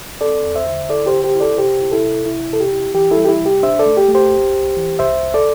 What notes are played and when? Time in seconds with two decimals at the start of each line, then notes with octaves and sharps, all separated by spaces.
0.21 C4 A4 D5
0.44 E2
0.55 C5 E5
0.67 D3
0.89 E4 A4 D5
1.06 G4 C5
1.13 D3
1.24 G4 C5
1.35 E4
1.40 A4 D5
1.57 C3 G4 C5
1.80 E4
1.92 E4 A4
2.03 C3
2.26 E4
2.50 C3 A4
2.60 G4
2.72 E4
2.94 E3 G4
3.11 E4 A4
3.17 G3
3.25 G4
3.29 E4
3.40 C3
3.46 G4
3.63 D4 C5 E5
3.79 A4 D5
3.86 A3
3.97 G4
4.09 A3
4.14 G4 C5
4.31 C2
4.54 C2
4.77 E3
4.99 C2 C5 E5
5.23 C2
5.34 A4 D5